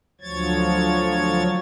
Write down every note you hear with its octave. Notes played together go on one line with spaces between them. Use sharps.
D2 F3 F#3 C#5 G#6 A6